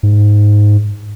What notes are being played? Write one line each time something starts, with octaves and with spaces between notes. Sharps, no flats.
G#2